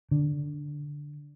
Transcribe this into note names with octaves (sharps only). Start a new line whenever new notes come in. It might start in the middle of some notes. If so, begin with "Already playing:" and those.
D3